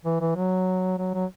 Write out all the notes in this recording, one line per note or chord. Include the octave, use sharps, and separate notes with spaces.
E3
E3
F#3
F#3
F#3